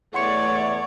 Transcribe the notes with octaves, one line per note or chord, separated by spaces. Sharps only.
E2 A3 C#5 D5 F#5 C6 C#7